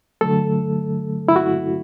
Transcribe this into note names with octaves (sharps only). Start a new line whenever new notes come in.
D3 F#3 A3 A4
E4
F#4